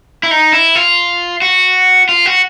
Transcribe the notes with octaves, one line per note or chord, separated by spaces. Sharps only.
E4
D#4
E4
F4
F#4
F4
F#4